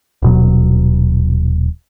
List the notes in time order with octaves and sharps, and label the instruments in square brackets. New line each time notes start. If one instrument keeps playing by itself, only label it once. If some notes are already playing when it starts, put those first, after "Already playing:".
[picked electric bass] D#1 B2 F#3